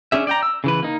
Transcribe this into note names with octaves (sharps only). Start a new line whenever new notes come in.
C#4 D4 G#4 E5
D5 G5 A#5
E6
C#3 E3 B4
A#3 D#4